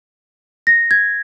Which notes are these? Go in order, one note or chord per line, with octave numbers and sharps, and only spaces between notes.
A#6
G#6